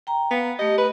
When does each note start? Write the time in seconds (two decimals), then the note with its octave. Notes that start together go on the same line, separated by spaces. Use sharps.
0.07 G5 A#5
0.31 B3 F5
0.59 A3 G4 D#5
0.78 B4 D#5